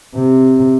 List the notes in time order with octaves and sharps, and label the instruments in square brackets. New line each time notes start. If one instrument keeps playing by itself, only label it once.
[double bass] C3